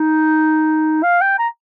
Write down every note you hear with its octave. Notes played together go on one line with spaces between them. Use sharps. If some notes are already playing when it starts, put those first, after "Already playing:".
Already playing: D#4
F5
G5
A#5